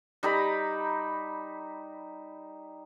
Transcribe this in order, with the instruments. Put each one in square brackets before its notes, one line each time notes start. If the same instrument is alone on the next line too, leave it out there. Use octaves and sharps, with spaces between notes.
[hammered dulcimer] G3 D#4 A#5 B5